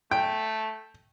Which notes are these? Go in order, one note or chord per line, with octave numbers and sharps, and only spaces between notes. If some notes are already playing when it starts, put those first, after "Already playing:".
A3 G5